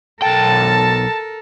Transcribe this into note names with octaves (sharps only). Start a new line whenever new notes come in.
B1 A4 A#4 G5 A5